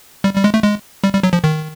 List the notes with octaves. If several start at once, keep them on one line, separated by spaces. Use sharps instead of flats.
G3
G3
G#3
A3
G#3
G3
G3
F#3
F3
D#3